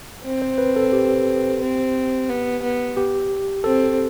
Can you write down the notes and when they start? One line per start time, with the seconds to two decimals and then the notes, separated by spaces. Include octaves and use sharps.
0.25 C4
0.42 C5
0.58 B4
0.76 A4
0.93 G4
1.61 C4
2.29 B3
2.63 B3
2.97 G4
3.64 C4 A4